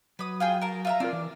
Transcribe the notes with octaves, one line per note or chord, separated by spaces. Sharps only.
F#3 B4 D#6
F4 G#4 G5
A#4 A5
F4 E5 A#5
C4 D4 F4 A#4
E3